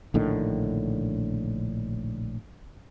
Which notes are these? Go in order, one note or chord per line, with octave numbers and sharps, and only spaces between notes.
A#1 A2 D3 D#3